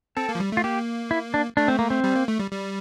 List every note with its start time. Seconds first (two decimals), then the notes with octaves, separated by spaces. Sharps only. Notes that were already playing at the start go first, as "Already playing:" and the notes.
0.17 C4 A4
0.29 A#3
0.35 F3
0.40 G3
0.52 A3 F4
0.64 A#3 G4
1.11 E4
1.34 D4
1.57 A3 D4
1.68 C4
1.79 A#3
1.90 C4
2.04 G3
2.16 A#3
2.28 A3
2.40 G3
2.51 G3